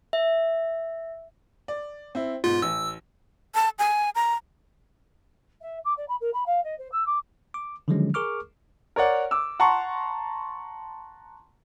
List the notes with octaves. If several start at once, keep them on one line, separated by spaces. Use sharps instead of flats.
E5
D5
C4 E4
G#2 B2 F4
A1 E6
A5
G#5
A#5
E5
D6
D5
B5
A#4
B5
F5
D#5
C5
E6
D6
D6
D3 D#3 F3 F#3 G#3 C#4
G#4 A#4 C#6 D6 F6
A#4 C#5 D5 F#5
D6 E6
F#5 A5 A#5 C6 C#6